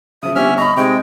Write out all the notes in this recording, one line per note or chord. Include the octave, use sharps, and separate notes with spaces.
C#3 F3 E5 D#6
G1 C4 C#4 G4 E5 F#5 F6
D#5 A#5 B5 C#6
C3 G#3 D#4 D#5 G5